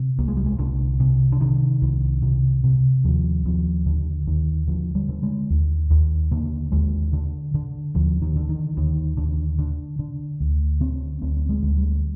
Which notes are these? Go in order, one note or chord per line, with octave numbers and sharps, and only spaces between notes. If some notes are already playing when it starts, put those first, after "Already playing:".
Already playing: C3
C2 A#3
G#3
G3
G#3
C2 D3
C3
D3
C3 D#3
C2 D#3
C3
C3
D#2 F3
D#2 F3
D#2 D3
D#2 D#3
D3 F3
G3
D3
G#3
D#2
D#2
D3 A#3
D#2 G#3
D3
D3
D#2 F3
D#3
D3
D#3
D#2 D#3
D#2 D3
D3
D3
D2
D3 C4
D2 C4
G#3
D2
G3